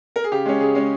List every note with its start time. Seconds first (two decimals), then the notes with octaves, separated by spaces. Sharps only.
0.16 A#4
0.24 G#4
0.32 C#3 G4
0.46 G#3 C#4
0.60 C#3 G#4
0.75 G#3 C#4